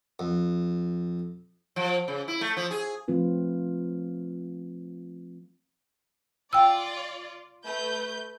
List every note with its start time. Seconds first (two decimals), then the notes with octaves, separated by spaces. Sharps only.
0.19 F2
1.76 F3
2.08 C#3
2.28 E4
2.41 A3
2.57 F3
2.71 G#4
3.08 F3 A3 C4 F4 B4
6.53 F4 D5 F5 G5 E6
7.65 A3 B4 G6